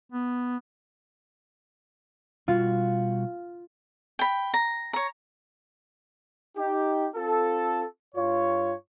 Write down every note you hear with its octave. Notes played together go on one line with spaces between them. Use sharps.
B3
B2 G3 F4 F#4
G5 B5
A#5
C#5 A#5
D#4 G4
C4 F4 A4
G2 F4 C#5